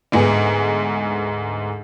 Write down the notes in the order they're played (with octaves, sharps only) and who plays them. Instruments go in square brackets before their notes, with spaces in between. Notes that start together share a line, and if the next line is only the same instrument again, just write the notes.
[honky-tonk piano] D2 G#2 B3 G#4